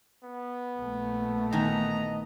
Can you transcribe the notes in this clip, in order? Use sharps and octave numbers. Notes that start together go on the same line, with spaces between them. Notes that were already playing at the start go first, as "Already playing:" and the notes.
B3
A#1 A3
D#3 E3 B3 D#5 A#5